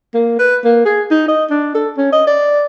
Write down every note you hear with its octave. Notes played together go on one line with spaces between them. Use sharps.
A#3
B4
A#3
G#4
D#4
D#5
D4
A4
C#4
D#5
D5